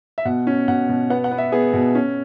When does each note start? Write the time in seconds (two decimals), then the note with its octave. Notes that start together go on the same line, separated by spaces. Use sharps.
0.18 E5
0.25 B2 F#5
0.47 C#4
0.68 B2 F#5
0.89 B2
1.10 B3 F#5
1.24 F#5
1.31 B3
1.38 E5
1.52 B3 G#4
1.73 B2
1.95 C#4